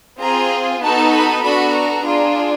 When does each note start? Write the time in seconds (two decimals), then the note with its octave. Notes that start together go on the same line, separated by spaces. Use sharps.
0.20 C4 F4 G#4 A#5
0.81 B3 D#4 F#4 A4 A5
1.13 B5
1.43 B3 D4 F#4 A4 B5
1.74 A#5
2.05 D4 F4 G#4